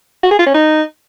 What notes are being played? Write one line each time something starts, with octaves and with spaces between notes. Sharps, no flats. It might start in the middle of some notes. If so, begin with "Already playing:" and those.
F#4
G#4
F4
C#4
D#4